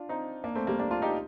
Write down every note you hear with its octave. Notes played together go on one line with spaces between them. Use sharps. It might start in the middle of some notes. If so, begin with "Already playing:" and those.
Already playing: D4 F4
C4 D#4
A#3 D4
A3 C4
G3 A#3
A#3 D4
D4 F4
D#4 G4